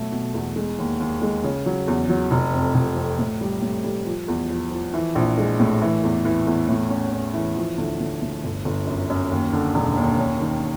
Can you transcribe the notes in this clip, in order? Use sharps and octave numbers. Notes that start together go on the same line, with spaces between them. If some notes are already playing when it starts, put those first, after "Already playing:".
Already playing: B2 F#3 A3
B2
E2
G#3
D#2
D#2
G#3
C#3
F#3
E2
F#3
F1
F2
F1
F2
A2
G3
A2
G3
F3
E2
F3
F3
E3
A#1
G#3
A2
E3
E2
E3
E2
A2
C#4
C#4
E3
F3
D2
D2
D2
G1
G1
F#2
F#2
D#2
D3
E1
D#2
C#4
D#3